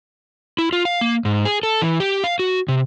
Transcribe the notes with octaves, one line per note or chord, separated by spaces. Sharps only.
E4
F4
F5
A#3
G#2
G#4
A4
E3
G4
F5
F#4
C3